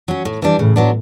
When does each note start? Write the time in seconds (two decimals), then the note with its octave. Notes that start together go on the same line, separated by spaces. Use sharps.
0.08 F#3 C#4
0.25 A2
0.42 E3 G3 D4
0.59 A2 C#3
0.76 F#3 B3 D4